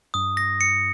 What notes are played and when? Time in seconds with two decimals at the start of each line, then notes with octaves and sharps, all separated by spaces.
0.14 G2 D#6
0.37 A#6
0.61 C#7